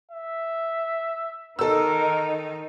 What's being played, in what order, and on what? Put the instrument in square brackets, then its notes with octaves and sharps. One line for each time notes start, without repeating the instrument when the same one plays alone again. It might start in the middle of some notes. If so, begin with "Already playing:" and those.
[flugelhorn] E5
[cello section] D#3 D#4 [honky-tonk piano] A4 E6 [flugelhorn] A#4